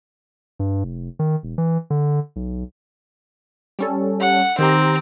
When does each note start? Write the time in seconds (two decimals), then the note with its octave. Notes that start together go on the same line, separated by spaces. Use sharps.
0.60 G2
0.84 F1
1.19 D#3
1.43 E1
1.58 E3
1.90 D3
2.36 B1
3.79 G3 C#4 A4
4.21 F#5
4.59 D#3 C4 G4 A#5